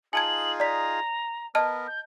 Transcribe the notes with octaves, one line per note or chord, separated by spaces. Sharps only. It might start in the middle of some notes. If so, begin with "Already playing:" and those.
D#4 F4 G#4 G#5 A5 G#6 F#7
D5 A#5 B6
B3 A#4 D#5 A5 F6
G6